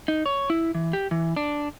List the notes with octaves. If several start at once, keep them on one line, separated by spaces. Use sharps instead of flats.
D#4
C#5
E4
E3
G4
E3
D4